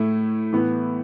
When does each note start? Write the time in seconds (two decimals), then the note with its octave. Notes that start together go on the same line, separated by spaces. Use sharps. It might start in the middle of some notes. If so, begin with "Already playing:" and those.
Already playing: A2 A3 E4
0.52 A2 E3 B3